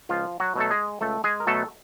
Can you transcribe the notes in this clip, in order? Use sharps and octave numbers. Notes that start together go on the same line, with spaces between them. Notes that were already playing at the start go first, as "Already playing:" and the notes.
C#2 F3 F4
F#3 F#4
B2 F#3 A3 A4
G#3 G#4
C#2 A3 A4
G#3 G#4
A#4
B2 F#3 A3 A4